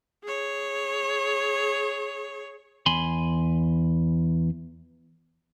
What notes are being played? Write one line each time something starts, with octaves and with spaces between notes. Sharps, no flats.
G#4 C#5
E2 G#5 B5 C6